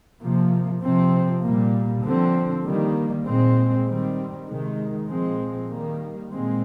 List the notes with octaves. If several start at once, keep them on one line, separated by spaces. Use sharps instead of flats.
C3 F3 A#3
C3 F3 C4
A#2 G3 A#3
D3 F3 C4
D#3 G3 A#3
A#2 G#3 C4
D#3 G3 C4
C3 D#3 G#3
A#2 F3 G#3 C4
D#3 G3 A#3
A#2 G#3 C4